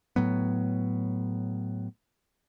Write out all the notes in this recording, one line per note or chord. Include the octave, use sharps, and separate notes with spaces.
A2 F#3 B3